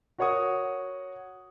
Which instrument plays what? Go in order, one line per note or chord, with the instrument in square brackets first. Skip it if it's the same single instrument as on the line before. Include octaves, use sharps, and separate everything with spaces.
[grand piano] F#4 A#4 C#5 F#5 C#6 D#6